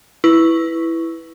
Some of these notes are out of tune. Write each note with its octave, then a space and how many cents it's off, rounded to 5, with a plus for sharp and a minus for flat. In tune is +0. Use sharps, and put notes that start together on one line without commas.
E4 +0 B4 +0 C#6 +0